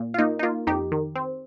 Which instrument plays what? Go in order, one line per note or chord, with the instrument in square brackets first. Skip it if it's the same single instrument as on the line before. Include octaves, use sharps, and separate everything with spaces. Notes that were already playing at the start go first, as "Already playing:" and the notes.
Already playing: [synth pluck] A#2
F4
A#3 D#4
D#4
A#3 F4
F2 D#4 G4
D#3
C4